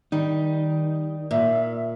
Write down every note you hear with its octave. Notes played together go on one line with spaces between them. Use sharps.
D#3 G3 D#4
A#2 E5